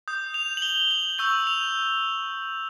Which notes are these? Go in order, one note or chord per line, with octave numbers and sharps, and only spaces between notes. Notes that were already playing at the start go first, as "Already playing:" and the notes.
D#6 G6
F7
F#7
G7
F#7
C#6 E6 G6 F#7
F7